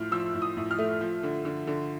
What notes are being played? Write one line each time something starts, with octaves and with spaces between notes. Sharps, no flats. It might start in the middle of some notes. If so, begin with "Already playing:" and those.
Already playing: A2 F3 F6
F3 E6
A2
D#6
A2
F6
A3
F3
D3
D3
D3